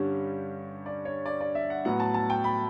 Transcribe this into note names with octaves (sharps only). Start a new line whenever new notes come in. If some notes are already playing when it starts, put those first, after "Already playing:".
Already playing: G2 D3 G3 C#4
D5
C#5
D5
D5
E5
F#5
A2 F#3 B3 F#5
A5
A5
G5
B5